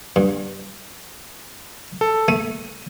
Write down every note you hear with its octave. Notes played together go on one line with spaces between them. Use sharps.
G2
A4
A3 D#7